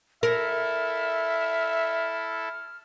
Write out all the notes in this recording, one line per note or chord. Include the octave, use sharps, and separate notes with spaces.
E4 A4 A#4 E5 F6